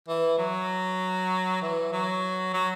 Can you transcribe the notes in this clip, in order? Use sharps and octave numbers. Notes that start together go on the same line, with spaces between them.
E3
F#3
E3
F#3
F#3